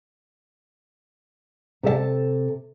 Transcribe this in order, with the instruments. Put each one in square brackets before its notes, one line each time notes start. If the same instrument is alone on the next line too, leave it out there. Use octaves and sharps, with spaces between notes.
[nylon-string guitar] C3 A4 E5 A5